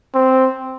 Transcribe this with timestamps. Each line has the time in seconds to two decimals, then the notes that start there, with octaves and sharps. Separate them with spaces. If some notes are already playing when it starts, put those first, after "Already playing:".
0.15 C4